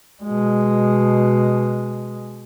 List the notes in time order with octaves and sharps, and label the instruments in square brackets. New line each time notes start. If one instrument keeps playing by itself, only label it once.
[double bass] B2 G#3